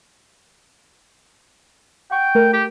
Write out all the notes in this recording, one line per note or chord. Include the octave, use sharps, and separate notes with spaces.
F#5 G5 C#6
A3 A#4
G4